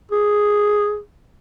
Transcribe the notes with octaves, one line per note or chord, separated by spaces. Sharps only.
G#4